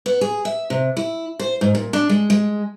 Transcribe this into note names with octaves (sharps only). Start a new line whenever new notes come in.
B3
G#4
E5
C3
E4
C5
G#2
A#2
D4
G#3
G#3